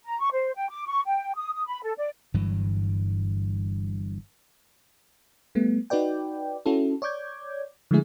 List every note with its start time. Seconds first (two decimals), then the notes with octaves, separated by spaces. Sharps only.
0.04 A#5
0.20 C#6
0.32 C5
0.56 G5
0.70 D6
0.87 C#6
1.06 G5
1.35 D#6
1.53 D#6
1.67 B5
1.82 A4
1.97 D5
2.34 G1 G2 E3 F#3
5.55 G3 A3 B3
5.90 D#4 F#4 B4 D5 G5
6.66 C#4 E4 F#4 A4
7.02 C#5 D5 D6 G6 G#6
7.91 D3 F3 G#3 A3 E4 G#4